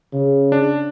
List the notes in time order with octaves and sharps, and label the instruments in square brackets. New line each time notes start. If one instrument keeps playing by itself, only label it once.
[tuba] C#3
[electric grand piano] D4